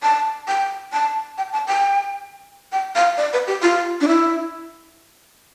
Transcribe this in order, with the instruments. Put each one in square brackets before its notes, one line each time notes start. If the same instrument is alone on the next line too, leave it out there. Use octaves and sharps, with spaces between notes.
[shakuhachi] A5
G5
A5
G5
A5
G5
G5
F5
D5
B4
G4
F4
D4
E4